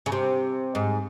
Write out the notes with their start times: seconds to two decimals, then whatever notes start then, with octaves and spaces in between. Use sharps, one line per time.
0.06 C#3
0.12 C3
0.75 G#2